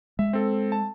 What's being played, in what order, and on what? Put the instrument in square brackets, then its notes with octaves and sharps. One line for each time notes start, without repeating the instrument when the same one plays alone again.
[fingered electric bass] G#3 [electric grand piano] E5
[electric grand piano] C4 A4
A5